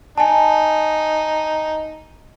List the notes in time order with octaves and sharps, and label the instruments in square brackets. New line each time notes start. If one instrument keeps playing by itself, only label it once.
[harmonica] D#4 [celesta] G#5 A5